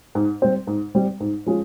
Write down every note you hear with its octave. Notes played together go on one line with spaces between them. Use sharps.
G#2
G3 C4
G#2
G3 C4
G#2
F3 G#3 C#4